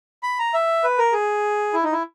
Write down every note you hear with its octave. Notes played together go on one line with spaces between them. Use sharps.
B5
A#5
E5
B4
A#4
G#4
E4
D#4
E4